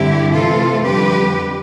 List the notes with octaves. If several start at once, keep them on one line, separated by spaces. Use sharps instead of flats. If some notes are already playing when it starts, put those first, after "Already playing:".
Already playing: G2 D3 G3 C4 E4 G4
C3 E3 A3 C4 F4 A4
F2 D3 G3 C4 G4 B4